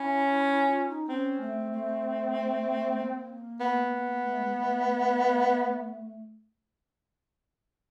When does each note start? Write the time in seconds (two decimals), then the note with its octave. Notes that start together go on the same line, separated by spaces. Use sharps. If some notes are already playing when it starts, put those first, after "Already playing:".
Already playing: C#4 E4
0.46 E4
0.67 F4
0.88 D#4
1.09 C4 C#4
1.40 A3
1.72 A3
2.98 B3
3.02 A#3
3.61 B3
4.24 A3
4.39 G#3
4.55 A3
4.70 A3
4.87 A#3
4.90 A3